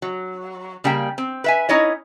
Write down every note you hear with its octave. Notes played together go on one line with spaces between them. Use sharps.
F#3
C#3 G3 A#3 G5
C4
B4 E5 G#5
C#4 D#4 E4 C#5 D#5